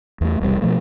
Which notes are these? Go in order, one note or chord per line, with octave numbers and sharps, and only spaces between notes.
E2 A3
E1 B1 C3 G3
B2 F3 A3